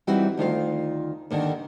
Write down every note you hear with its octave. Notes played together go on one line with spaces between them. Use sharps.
E3 G3 C4 D#4 E4 F#4
D2 D#3 F4 F5
D#2 D3 D#3